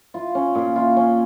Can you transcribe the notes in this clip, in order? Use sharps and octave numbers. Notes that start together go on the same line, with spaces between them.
F4
C#4
A#2
F4
C#4